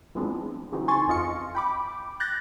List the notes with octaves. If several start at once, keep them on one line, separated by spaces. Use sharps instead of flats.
E3 F3 G#3 B3 C4 D4
C#3 E3 F#3 C4 D#4
G#5 C6 C#6 A6
F2 F3 D#5 F5 C#7
G5 B5 D6
F#6 G6 A6 A#6